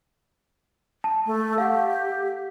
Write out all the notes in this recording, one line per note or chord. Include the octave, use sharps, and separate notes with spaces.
A5
A3
G4 F5 F#5